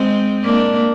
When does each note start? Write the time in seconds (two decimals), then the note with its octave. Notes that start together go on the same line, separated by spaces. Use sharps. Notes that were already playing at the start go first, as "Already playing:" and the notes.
Already playing: G#3 C4
0.44 A#3 D4